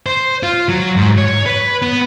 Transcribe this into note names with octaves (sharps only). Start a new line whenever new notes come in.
C5
F4
F#3
G#2
C#5
B4
B3